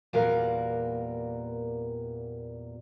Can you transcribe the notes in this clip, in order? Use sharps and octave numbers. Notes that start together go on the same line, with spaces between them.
E2 A#2 G3 F#4 A#4 F5